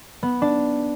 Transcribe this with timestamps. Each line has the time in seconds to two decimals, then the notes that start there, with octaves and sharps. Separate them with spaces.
0.23 B3
0.42 D4